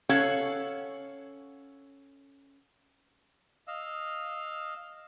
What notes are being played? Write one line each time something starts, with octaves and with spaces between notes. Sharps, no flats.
C#4 A4 C#5 F5 F#5
D#5 F5 E6